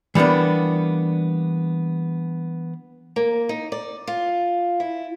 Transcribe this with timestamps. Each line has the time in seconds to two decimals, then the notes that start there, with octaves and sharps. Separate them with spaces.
0.15 E3 G3 A#3 B3 D4
3.16 A#3
3.49 D#4
3.72 D5
4.07 F4
4.80 E4